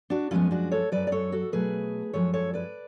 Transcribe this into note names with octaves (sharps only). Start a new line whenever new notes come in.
D4 F#4
F#2 F3 G#3 B3 C#4 F4
D4 F#4
A4 C#5
F#2 C#3 F#3 B4 D5
D5
A4 C#5
F#4 A4
B2 F#3 A3 G#4 B4
F#2 F3 G#3 A4 C#5
A4 C#5
B4 D5